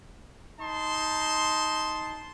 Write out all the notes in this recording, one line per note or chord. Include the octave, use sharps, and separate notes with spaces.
D#4 A5 C6